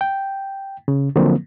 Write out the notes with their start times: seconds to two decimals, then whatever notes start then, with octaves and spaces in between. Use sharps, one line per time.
0.01 G5
0.88 C#3
1.16 D3 F3 F#3 A#3 C4